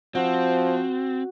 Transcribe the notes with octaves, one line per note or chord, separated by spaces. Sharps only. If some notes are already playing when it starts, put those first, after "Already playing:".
F3 C4 F#4